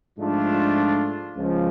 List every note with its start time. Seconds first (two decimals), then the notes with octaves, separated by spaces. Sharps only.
0.17 G#2 F3 A3 D4 F4
1.36 C#2 C#3 F3